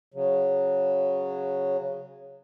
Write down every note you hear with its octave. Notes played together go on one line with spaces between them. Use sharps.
C#3 F#3